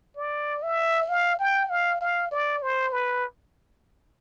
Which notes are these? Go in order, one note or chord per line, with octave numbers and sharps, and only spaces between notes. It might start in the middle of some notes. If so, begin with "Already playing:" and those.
D5
E5
F5
G5
F5
F5
D5
C5
B4